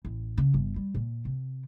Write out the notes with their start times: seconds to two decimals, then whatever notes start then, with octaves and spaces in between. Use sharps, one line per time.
0.05 A1
0.38 C#3
0.54 G1
0.76 G3
0.95 A#2
1.25 C3